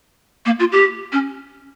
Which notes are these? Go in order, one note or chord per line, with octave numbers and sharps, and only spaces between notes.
A#3
F4
G4
C#4